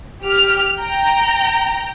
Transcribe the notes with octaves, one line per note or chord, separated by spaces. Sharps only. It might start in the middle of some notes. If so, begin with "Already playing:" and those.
G4 F6
G5 A#5